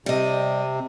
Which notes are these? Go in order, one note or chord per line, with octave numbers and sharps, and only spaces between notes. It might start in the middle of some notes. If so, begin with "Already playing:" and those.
C3 G3 D#5